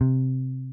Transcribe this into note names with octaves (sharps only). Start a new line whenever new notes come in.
C3